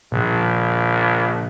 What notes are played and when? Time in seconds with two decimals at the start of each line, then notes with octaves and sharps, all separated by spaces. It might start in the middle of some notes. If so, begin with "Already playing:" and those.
0.12 A#1 A#2 C#3 F3